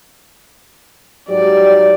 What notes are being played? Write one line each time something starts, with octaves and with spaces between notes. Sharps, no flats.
G#2 F#3 G4 D5